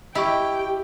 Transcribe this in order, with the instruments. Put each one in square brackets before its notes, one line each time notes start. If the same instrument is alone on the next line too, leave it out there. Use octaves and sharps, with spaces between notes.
[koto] E4 [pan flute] G4 [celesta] D#5 C#6 [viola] G5